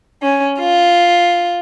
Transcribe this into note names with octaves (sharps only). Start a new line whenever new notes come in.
C#4
F4